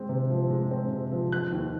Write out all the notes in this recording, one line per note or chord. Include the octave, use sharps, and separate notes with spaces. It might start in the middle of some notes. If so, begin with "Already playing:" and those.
Already playing: G#3 C4
C3
F3
G#3
C4
C3
F3
F3 F#6
D#2